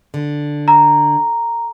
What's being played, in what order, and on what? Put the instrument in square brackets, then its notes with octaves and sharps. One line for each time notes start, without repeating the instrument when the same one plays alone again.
[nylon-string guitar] D3
[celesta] A#5